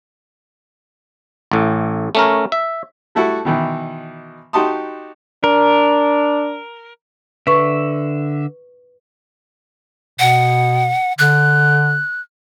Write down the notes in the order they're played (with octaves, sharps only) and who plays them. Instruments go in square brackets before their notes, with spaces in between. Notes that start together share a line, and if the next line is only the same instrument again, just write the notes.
[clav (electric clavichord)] A1 A2
A3 C#4 A#4
E5
[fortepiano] G3 A3 E4 F#4 A4
B2 D#3 E3
D#4 F#4 G4 A5 C6 D#6
[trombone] D4 [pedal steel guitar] A#4
[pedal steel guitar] D3 E5 [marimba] B4 C#6
[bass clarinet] B2 [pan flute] F#5
[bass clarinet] D3 [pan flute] F#6